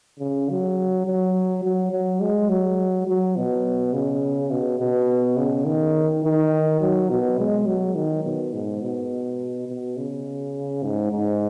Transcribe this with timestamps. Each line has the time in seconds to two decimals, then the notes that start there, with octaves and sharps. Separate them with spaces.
0.19 C#3
0.49 F#3
1.06 F#3
1.64 F#3
1.92 F#3
2.20 G#3
2.49 F#3
3.07 F#3
3.36 B2
3.93 C#3
4.51 B2
4.79 B2
5.37 C#3
5.65 D#3
6.24 D#3
6.81 F#3
7.10 B2
7.38 G#3
7.66 F#3
7.95 D#3
8.24 B2
8.54 G#2
8.81 B2
9.68 B2
9.97 C#3
10.83 G#2
11.11 G#2